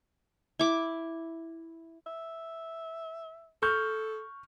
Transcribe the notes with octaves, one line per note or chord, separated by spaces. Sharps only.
E4 D6
E5
A4 C#6 F6 G6